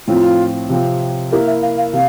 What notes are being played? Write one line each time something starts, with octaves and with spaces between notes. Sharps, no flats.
A2 F3 C4 F4
C3 F3 C4
A#3 E4 G4 A#4
E5
F5
F5
C3 F5